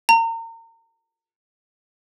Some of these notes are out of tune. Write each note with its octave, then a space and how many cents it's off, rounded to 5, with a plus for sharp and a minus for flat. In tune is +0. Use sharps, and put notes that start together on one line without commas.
A#5 -35